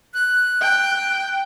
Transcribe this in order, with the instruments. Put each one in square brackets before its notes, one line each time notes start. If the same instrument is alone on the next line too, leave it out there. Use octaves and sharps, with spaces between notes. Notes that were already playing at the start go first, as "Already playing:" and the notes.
[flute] F#6
[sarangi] G5